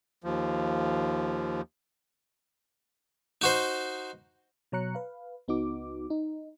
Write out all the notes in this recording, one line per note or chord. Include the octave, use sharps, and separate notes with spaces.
D#2 F3
D#4 F#4 C5
B2 F#3 C#5 A#5 F#6 C#7
B4 F5
C#2 B3 D#4 F#4 D6
D#4